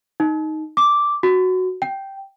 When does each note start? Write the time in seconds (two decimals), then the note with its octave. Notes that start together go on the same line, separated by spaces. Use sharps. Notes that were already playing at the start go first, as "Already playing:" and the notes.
0.20 D#4
0.77 D6
1.23 F#4
1.82 G5